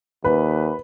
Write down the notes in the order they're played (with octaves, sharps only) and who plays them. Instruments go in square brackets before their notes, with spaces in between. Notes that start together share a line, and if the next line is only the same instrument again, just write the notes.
[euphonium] D#2 [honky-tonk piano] B4